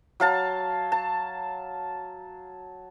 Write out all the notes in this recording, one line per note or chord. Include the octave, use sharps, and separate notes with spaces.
F#3 F5 A5
A5